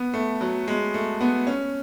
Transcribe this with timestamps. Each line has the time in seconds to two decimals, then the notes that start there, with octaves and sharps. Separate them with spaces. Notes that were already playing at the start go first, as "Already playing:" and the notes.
Already playing: B3
0.14 A3
0.41 F#3
0.68 G#3
0.94 A3
1.21 B3
1.47 C#4